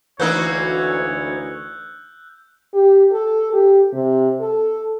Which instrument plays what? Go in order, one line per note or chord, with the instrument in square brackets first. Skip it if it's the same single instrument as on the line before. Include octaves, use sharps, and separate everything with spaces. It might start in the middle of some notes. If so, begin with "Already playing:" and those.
[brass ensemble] D2 [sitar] E3 A#3 D#4 [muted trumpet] C#5 [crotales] E6 F#6 G6
[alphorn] G4
A4
G4
C3
A4